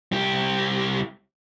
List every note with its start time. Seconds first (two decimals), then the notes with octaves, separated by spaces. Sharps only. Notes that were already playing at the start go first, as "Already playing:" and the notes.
0.12 C2 G4